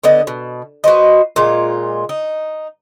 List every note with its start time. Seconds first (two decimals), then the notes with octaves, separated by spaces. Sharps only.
0.04 D3 B3 D#5
0.27 B2
0.84 F#4 B4 C5 D#5
1.36 A#2 G#3 F4
2.09 D#4